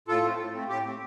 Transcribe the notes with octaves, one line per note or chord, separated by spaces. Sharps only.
A2 F4 A4
A3 C4
A2
A3 C4
A2 G4
A3 C4